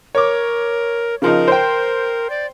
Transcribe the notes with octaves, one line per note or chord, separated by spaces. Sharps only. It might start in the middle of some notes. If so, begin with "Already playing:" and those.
A#4 C#5 D6
C#3 F3 D#4 A#4
C5 G5
D5